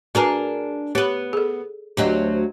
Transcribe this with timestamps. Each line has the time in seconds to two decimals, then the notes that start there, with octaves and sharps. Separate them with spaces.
0.15 D4 F#4 G#4 A#4 B4 A#5
0.95 B3 G4 B4 C#5
1.33 G#4 A4
1.97 D2 F#3 C4 G4 D#5